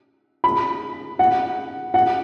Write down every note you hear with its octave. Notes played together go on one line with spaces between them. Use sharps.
B5
F#5
F#5